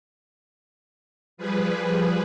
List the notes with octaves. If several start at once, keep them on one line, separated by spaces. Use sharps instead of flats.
F3 G3 G#4 B4